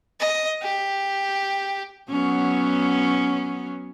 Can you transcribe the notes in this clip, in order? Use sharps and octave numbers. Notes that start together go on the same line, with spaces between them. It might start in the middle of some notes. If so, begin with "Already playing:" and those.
D#5
G4
F#3 B3 C#4